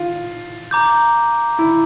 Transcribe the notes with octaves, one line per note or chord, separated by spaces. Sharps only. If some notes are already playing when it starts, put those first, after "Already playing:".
Already playing: F4
A#5 D6 G6
E4